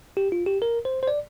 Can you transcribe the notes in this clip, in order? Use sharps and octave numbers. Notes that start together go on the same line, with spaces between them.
G4
F4
G4
A#4
C5
C5
D5